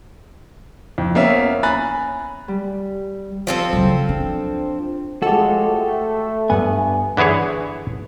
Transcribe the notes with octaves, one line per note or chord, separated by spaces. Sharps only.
F2
A#3 B3 C#4 E5
G#5 A#5 B5 F#6 A6
G3
F3 C4 A4
C#3 F#3
D4
A2 F3 G#3 F#4 G4 A4
A3
G2 B3 G#5
D3 E3 E4 G#4 C#5